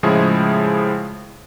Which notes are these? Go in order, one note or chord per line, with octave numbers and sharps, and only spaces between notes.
A2 C#3 F3 G#3 E4 G#4